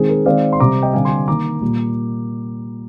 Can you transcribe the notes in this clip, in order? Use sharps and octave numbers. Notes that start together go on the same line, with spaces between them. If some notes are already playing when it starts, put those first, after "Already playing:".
Already playing: D#3 G#3 C4 G#4
A#4
D#3 G#3 C4 D5 F5
C6
C3 G3 C4 A#5 D6
D#5 G5
D3 G3 C4 F5 G#5
G#5 C6
D#3 A#3 A#5 D6
A#2 G3 A#3